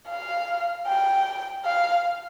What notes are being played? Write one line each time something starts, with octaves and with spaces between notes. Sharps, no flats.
F5
G5
F5